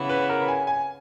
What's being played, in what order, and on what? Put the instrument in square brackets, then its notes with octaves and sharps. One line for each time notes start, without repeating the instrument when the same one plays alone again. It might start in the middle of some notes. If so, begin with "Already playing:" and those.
Already playing: [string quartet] C#3 E3 B3 E4
[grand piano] B4
A#4
G#5
G#5